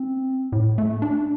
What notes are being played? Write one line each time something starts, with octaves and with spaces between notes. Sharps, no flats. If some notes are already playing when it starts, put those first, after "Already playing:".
Already playing: C4
A2
A3
D4